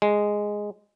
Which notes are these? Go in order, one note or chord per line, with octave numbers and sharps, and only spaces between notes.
G#3